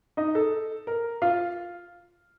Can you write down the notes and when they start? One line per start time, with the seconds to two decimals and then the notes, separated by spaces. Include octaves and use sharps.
0.17 D#4 D#5
0.35 A4
0.87 A#4
1.22 F4 F5